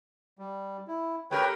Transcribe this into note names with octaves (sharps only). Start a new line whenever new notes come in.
G3
E4
A3 G4 A#4 B4 C#5 G5